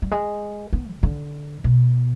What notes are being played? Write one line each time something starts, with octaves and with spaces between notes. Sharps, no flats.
G3
G#3
B3
C3
D3
B2